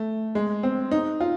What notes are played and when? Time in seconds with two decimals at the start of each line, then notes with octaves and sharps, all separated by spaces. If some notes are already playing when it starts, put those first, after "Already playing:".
Already playing: A3
0.35 G#3
0.63 C4
0.91 D#4
1.21 F4